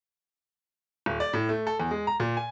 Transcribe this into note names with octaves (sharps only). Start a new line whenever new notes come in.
D#1
D5
A2
A3
A4
E2
G#3
A#5
A#2
G#5